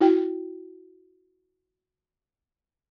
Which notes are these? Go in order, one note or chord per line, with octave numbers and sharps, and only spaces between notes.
E4 F#4 G5